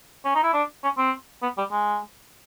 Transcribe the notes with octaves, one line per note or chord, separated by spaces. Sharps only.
C#4
D#4
E4
D4
C#4
C4
B3
G3
G#3